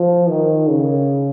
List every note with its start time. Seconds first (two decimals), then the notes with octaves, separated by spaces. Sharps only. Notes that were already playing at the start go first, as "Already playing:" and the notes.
Already playing: F3
0.29 D#3
0.69 C#3